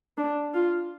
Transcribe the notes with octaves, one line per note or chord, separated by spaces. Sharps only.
D4
F4